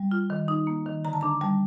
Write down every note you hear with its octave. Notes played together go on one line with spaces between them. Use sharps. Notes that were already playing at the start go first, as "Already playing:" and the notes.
Already playing: G3
F4
D#3
D#4
A#3
D#3
D3 A#5
A5
D4 A#5
G3 A5